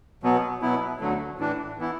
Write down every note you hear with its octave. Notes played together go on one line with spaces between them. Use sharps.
B2 F#3 B3
B2 F#3 B3 E4
D2 D3 F#3 A3
A2 E3 D4
E3 B3 E4